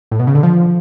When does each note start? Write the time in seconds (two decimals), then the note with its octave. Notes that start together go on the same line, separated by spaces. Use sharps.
0.11 A2
0.19 B2
0.27 C#3
0.35 D3
0.43 F3